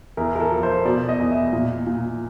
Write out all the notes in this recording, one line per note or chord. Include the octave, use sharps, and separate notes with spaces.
E2 A#4
A#4
A4
F3
C5
B2 D5
D#5
E2
E5
A#2
A#2